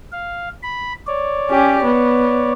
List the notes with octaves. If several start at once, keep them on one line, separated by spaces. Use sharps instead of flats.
F5
B5
C#5 D5
C#4 G4
B3